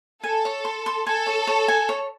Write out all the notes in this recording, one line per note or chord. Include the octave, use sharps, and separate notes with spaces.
A4 G#5
C#5
C6
C6
A4 G#5
C#5
C#5
G#5
C#5